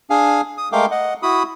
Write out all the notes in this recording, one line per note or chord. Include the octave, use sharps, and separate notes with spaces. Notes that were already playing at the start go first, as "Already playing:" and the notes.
D4 G#4 F5 G#5
D#6
G#3 A3 A#4 F5 G5 D6
D#5 F#5
E4 F#4 B5 D#6